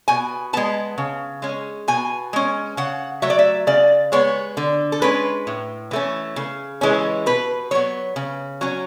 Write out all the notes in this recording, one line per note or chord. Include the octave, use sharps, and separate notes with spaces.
B2 G#5
G#3 B3 A5
C#3
G#3 C#4
B2 G#5
G#3 C#4
C#3 F#5
F#3 A3 E5
D5
E5
C#3 D5
G#3 B3 C#5
D3
A4
G#3 C#4 B4
A2
E3 A3 C#4
C#3
E3 G#3 C#4
B2 B4
F#3 B3 C#5
C#3
F#3 C#4